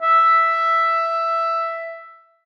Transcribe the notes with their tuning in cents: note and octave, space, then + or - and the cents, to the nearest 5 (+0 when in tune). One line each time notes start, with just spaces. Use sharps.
E5 +5